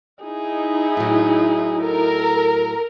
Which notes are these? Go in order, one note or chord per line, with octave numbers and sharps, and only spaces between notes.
D#4 E4 G#4
A2 F#3
A4 A#4